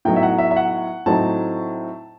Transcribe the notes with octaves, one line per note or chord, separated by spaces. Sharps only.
A2 F#3 B3 D#4 G5
E5
F#5
E5
E5
F#5
A2 F#3 C4 D#4 A5